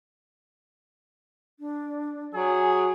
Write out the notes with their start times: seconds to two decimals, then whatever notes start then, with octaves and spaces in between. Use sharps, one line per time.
1.60 D4
2.34 F#3 G#4 G#5